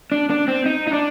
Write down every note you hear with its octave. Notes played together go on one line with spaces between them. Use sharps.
D4
D4
C4
D#4
D#4
D4